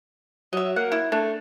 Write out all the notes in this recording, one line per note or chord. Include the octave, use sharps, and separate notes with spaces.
F#3 D#5 E5
A#3 F#5
E4
A3 D4